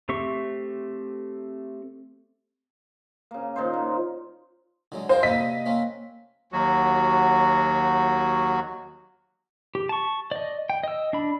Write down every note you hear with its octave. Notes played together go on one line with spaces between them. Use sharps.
A3 C4 G4 E5 C#6
C#3 A#3
A#2 D#3 D#4 C5
A#3
D3 F#3 G#3
C5 D#5 F5 G5
C3 G3 A#3 D#5 B6
A#3 C4 C#4
D#2 F#3 F#4
G4
A5 C#6
D5 D#5
G5
D#5 E6
D4 B5